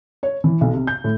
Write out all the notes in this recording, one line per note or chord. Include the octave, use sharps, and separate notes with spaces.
C#5
E3
B1
C3
G6
A2